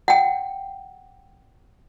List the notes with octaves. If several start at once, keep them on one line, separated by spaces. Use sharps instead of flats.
F#5 G5